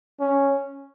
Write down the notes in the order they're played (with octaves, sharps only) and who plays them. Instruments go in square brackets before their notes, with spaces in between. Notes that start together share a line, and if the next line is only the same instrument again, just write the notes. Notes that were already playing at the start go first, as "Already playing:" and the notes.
[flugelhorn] C#4